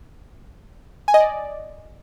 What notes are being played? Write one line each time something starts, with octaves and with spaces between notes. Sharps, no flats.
G#5
D#5
D5